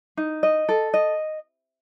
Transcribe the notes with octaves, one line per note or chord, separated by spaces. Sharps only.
D#4
D#5
A4
D#5